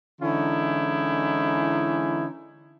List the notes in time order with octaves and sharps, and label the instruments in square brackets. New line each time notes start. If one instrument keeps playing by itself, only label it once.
[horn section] D3 E3 G#3 C#4 D#4 E4